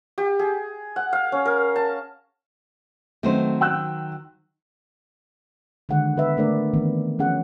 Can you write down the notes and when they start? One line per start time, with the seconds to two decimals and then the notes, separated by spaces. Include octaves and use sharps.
0.18 G4
0.39 G#4
0.96 F#5
1.13 F5
1.32 C#4
1.45 A#4
1.76 A5
3.23 D#3 F#3 A3 C4 C5
3.61 G5 E6 F#6
5.89 D3 D#3 G#3 G#4 F#5
6.16 B3 B4 E5
6.37 A3 D4 A#4 D5
6.74 D#3 E3 B3 C4
7.19 F3 C#4 G#4 F#5